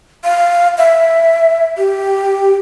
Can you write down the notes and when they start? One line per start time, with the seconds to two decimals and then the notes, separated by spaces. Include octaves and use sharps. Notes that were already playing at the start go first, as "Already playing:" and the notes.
0.24 F5
0.78 E5
1.78 G4